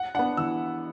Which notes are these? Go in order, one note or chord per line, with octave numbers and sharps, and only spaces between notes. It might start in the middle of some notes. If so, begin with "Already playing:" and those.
Already playing: F#5
B3 D4 F#5
E3 E6